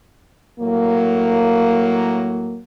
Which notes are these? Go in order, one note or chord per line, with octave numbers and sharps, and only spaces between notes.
A2 F#3 A#3